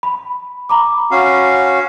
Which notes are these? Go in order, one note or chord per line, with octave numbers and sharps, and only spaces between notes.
B5
A#5 B5 D6
C#4 F#4 F5